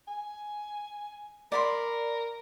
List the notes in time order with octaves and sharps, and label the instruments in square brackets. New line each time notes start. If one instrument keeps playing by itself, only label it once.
[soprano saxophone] G#5
[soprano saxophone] A#4 [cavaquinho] D5 B5 C6